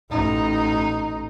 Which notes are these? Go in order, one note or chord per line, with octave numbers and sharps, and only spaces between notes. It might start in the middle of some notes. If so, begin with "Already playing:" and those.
A1 D#4